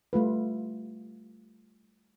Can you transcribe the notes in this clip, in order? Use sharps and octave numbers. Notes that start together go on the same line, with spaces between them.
G3 A3 F4 B4